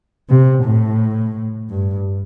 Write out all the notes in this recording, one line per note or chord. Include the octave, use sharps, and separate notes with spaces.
C3
A2
G2